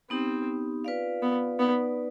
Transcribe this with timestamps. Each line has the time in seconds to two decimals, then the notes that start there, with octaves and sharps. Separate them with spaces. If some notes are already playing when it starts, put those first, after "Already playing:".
0.10 B3 C4 D#4 G4
0.85 F4 B4 D5 F5
1.22 B3
1.59 B3 D#4 B4 D5